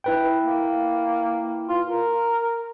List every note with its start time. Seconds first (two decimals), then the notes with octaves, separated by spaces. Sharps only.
0.04 E4 B4 G5
0.40 A#3
1.68 F4
1.86 A#4